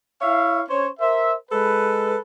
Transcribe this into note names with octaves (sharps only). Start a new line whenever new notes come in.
E4 C#5 E5 F5
C#4 C5 C#5
A#4 C5 E5
G#3 A4 B4